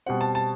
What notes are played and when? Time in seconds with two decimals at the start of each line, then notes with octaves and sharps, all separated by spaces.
0.06 B2 G3 C4 F#5
0.21 A5
0.35 A5